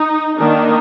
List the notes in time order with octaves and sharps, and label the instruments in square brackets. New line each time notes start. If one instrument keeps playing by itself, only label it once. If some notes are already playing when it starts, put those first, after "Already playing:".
Already playing: [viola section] D#4
D#3 A#3 D4 D#4